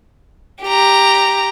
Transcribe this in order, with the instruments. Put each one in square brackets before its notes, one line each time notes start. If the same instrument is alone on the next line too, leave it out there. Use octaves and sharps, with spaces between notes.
[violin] G4 A#5